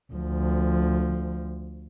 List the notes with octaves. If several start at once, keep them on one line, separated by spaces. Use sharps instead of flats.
D2 F3